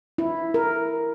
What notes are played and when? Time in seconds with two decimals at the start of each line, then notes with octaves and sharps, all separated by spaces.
0.18 E4
0.54 A#4